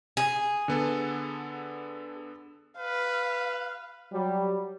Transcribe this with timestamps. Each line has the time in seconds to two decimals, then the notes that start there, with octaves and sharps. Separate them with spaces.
0.17 G#4
0.68 D3 B3 A4
2.77 B4 F5
4.12 F#3 G3